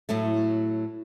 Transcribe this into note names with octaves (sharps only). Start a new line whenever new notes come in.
A2 F#3 A3